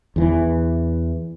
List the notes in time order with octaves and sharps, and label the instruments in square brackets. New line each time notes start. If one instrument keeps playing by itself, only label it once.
[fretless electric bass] E2 E3